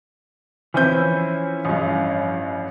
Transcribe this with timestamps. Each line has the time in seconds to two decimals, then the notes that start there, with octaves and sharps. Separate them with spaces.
0.74 E3 F3 C4 C#4 E4 G6
1.65 A1 G2